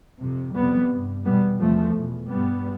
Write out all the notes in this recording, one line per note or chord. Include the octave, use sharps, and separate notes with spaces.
F2 C3
F2 C3 G3 B3
G2
E2 B2 G3 B3
E2 C3 F3 A3
E2 B2
G2 G3 B3